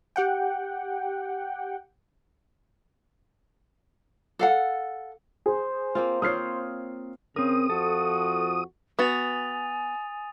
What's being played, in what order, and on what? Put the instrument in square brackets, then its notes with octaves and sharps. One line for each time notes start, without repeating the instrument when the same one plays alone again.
[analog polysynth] G4 F#5 G5
[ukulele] A4 F5 F#5
[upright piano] G#4 [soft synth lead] C5
[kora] A#3 C4 F4
[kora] C4 F4 C#5 [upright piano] D#6 F6 C7
[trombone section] C#3 [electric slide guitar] C4 A#4 [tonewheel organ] D#6
[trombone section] F2 F3 F#4 [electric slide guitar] A4
[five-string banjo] B3 F#4 [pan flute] G#5 [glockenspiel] D#6 A6 F7